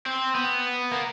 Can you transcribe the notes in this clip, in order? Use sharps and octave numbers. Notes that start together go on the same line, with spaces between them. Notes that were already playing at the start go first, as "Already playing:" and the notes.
C4
B3
A#3